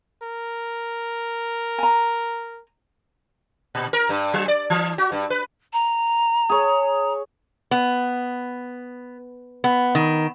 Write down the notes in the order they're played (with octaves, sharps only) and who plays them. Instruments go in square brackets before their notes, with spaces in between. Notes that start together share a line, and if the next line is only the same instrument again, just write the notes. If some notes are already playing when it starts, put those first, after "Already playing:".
[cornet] A#4
[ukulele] G#5 A#5
[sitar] A#2
A#4
G2
F#3
D5
E3
F#4
G2
B4
[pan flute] A#5
[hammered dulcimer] G#4 C#5
[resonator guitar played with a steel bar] B3
B3
D#3